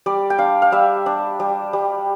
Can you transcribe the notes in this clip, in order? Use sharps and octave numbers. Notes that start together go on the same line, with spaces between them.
G3 D5
G5
D4 F5
F5
G3 E5
D4
G3
G3